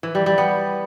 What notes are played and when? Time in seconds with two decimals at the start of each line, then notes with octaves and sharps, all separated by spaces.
0.03 E3
0.15 G3
0.26 G3
0.38 B3